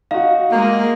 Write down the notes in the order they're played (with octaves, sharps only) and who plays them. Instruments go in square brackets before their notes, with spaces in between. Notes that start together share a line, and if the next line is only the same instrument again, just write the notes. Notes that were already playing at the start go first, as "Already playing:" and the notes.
[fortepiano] D#4 F#4 [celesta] F5
[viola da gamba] G#3 [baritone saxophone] A#3